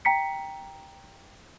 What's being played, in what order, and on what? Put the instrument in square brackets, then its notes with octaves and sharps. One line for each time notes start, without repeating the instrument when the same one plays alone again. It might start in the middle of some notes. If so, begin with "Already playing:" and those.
[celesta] G5 A#5 B6 C#7